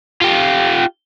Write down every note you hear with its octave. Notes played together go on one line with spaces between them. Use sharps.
F4 G4